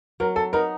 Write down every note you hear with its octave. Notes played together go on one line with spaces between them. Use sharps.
F#3 A#4
A4
B3 D#4 A#4